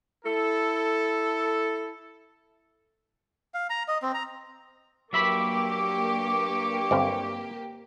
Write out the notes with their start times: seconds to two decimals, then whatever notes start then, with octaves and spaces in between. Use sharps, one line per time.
0.24 E4 A4
3.54 F5
3.70 A#5
3.88 D#5
4.02 C4
4.14 A#5
5.13 G2 F#3 A#3 G4 E5 B5 C#6 D6
6.91 G1 C4 F5